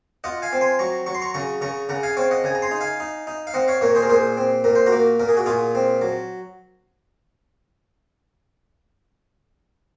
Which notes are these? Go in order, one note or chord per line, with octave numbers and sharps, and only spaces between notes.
F4 D#5 F#5
F5 G#5
C4
G#5 C6
F#3 A#5 C#6
F#3 C#6
C6
A#5 C#6
C#3 A#5 C#6
C#3 A#5 C#6
C#3 F#5 A#5
F5 G#5
C4 C#5 F5
D#5 F#5
C#3 G#5
A#5
G#5 C6
D#4
F5 G#5
D#4
D#4
F5
C4 D#5 F#5
C#5 F5
A#2 A#4 C#5
G#4 C5
A#4
A#2 G#4 C5
C4
A#2 A#4
C5
F#4 A#4
A#3
A#2 A#4
G#4
F#4
A#2 F4 G#4
C4
F#3